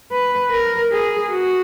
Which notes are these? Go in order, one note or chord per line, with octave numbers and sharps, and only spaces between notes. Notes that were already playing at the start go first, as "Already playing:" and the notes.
B4
A#4
G#4
F#4